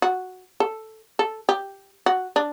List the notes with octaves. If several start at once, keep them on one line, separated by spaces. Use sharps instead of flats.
F#4
A4
A4
G4
F#4
D4